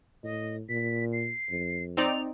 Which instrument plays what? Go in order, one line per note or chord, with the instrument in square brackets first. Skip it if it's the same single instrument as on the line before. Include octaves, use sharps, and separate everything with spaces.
[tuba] A2 [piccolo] D#5
[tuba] A#2 [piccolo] B6
[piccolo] C7
[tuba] F2
[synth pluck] C4 D#4 D5 [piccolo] F7